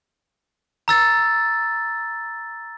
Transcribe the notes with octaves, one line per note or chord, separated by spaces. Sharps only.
A#5 E6 A6